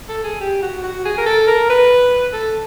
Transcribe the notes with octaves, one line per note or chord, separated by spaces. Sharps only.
A4
G#4
G4
F#4
F#4
G#4
A#4
A4
A#4
B4
A4